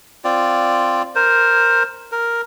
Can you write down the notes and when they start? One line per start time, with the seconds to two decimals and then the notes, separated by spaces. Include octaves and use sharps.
0.24 C4 F4 D5
1.15 A#4 C5
2.12 A#4